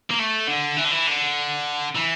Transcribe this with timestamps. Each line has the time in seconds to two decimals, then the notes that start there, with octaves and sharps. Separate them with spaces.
0.10 A#3
0.19 A3
0.47 D3
0.77 E3
0.85 D3
0.91 E3
1.07 D3
1.96 E3